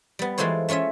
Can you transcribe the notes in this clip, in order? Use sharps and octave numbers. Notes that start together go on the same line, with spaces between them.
G3 B3
E3 G#3 F4 A4 C5 C#5
A3 C#4 F4 C#5 E5